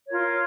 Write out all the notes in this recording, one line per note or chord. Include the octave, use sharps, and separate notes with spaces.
F4 A#4 C#5